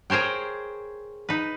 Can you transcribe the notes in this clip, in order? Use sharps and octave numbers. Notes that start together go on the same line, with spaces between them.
G#4 A#4 C5 C#5 G5
D#4 B4